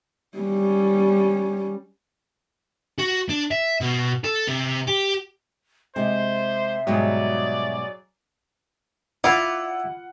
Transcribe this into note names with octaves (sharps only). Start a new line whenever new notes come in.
G3 C#4
F#4
D4
E5
B2
A4
C3
G4
C3 G#3 C5 E5
G#2 B2 F#3 G3 G#4 D5
E4 F4 D5 F5 F#5